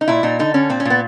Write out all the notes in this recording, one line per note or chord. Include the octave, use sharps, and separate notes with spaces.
D#4
A#2 E4
A#2 D#4
D3 D#4
D3 C#4
A#2 C4
C#4
A#2 B3